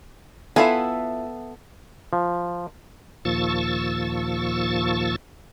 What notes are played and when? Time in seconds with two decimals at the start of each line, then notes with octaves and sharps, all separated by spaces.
0.56 B3 E4 F4 A4 E5 G#5
2.13 F3
3.25 D#2 A#2 F3 C#6 E6 A6